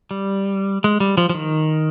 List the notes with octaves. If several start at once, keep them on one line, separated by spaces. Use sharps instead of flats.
G3
G#3
G3
F3
F3
D#3